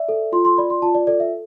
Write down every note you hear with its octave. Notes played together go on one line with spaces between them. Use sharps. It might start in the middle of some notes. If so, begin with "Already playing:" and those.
Already playing: D5 E5
A4
F4 C6
C6
D5 B5
C6
F4 A5
D5
A4 D5
E5